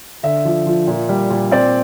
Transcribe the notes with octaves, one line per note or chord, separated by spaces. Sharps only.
D3 E5
F3
F3
A#2
G3
A#2
C4 D5